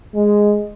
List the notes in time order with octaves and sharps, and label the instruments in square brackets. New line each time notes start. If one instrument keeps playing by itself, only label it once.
[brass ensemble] G#3